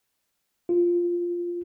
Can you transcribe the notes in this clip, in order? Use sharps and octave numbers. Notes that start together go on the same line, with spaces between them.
F4